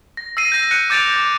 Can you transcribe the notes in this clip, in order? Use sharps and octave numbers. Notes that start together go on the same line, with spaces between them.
A#6
E6 A#6 C7 D#7
G6 A#6
F#6 C#7 D#7
D6 G6 A6 A#6 D7 F7
D6